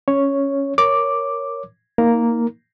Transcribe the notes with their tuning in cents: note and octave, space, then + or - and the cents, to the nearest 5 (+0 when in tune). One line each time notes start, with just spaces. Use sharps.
C#4 +0 C#5 +0
A#4 +0 C#5 +0 D6 +0
A#3 +0 D#4 +25 A#4 +0